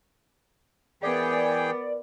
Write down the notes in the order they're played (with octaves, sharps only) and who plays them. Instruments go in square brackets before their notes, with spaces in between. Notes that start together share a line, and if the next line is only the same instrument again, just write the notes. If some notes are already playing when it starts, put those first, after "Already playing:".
[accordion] E3 G#4 G5 [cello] B3 [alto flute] A#4 [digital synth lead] D5